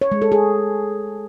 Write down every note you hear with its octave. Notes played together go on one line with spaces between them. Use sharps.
C#5
G#3
A4
G#4